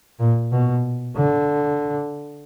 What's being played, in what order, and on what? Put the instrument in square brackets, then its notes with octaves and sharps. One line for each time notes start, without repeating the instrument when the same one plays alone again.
[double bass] A#2
B2
D3